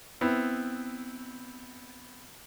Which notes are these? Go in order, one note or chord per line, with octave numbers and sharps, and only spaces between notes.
B3 C4 E4